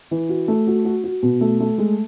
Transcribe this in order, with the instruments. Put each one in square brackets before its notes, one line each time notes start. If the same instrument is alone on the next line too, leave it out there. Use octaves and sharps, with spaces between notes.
[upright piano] E3
F#4
A3
F#4
F#4
F#4
B2
A3
A3
G#3